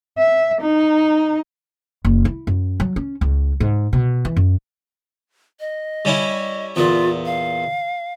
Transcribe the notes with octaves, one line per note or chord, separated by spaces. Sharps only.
E5
D#4
F#1
E4
F#2
F#3
C#4
C#2
G#2
B2
E3
F#2
D#5
G3 C#4 E4
E2 A#2 F4
F5